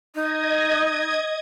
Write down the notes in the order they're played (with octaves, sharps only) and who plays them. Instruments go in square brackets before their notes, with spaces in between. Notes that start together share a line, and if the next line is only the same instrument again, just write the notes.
[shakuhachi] D#4 [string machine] D#5 D#6 G#6